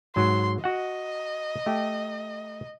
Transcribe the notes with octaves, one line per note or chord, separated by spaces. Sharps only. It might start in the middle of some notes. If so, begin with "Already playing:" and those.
G#2 F#3 C6
F#4 D#5 F#5
A3 G4